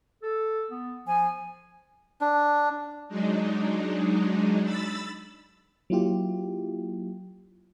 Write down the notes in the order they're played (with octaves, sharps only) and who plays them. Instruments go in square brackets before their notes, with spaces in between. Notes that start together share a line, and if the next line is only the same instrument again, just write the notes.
[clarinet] A4
B3
[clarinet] F3 [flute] G#5
[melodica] D4
[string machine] F#3 G#3 D4 D#4
B5 E6 A6
[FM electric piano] F#3 A#3 E4 F4 G4